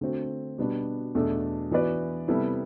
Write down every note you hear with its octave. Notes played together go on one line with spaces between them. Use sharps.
D3 A3 C4 F#4
B2 G3 B3 D4 F#4
E2 B2 A3 D4 A4
E3 B3 F#4 B4 D5
C3 G3 B3 E4 A4